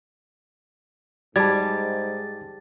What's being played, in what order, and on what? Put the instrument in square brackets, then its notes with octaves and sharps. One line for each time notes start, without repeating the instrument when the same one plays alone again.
[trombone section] G#2 [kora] G3 [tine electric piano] A5 D6 G#6 [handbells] A6